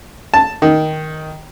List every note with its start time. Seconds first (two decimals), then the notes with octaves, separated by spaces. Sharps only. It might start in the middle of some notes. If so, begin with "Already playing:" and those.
0.34 A5
0.62 D#3